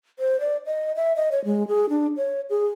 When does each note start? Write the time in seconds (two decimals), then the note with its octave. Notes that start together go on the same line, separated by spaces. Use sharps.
0.19 C5
0.40 D5
0.66 D#5
0.96 E5
1.16 D#5
1.32 C#5
1.45 G#3
1.68 G#4
1.89 D4
2.17 C#5
2.50 G#4